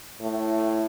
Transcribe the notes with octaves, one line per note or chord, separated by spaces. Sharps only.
A2